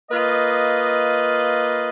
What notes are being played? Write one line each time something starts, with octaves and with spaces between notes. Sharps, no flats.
A#3 F4 B4 D#5